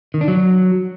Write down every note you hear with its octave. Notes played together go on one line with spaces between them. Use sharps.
D#3
D4
F#3